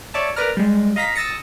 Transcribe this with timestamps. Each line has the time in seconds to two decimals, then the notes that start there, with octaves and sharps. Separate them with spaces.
0.14 C#5 D5 E5 A5
0.36 A#4 B4 D5 A#5 F6
0.57 G3 G#3
0.96 D#5 F5 A#5 B6
1.15 D#6 E6 A6 A#6 C#7